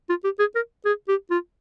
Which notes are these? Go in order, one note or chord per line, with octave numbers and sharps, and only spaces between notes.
F4
G4
G#4
A#4
G#4
G4
F4